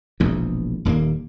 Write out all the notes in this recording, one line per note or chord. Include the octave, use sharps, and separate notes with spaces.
E1 A#1 E2
D#1 D#2 F3 A#3